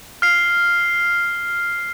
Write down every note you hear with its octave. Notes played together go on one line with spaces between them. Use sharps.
F6 C7